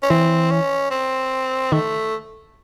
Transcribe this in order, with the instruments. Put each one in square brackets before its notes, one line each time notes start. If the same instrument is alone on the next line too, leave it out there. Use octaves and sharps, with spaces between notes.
[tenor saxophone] C#4
[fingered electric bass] E3 [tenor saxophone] C4
[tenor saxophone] C#4
C4
[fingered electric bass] D#3 [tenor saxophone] A3